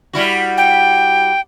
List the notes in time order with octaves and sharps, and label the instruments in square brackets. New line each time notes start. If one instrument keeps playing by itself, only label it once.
[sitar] G3 E4 F#4
[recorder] G5